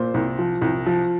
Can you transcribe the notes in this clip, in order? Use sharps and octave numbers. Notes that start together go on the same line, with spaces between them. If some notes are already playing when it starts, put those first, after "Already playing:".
Already playing: A#2 C5
C2
F3
C2
F3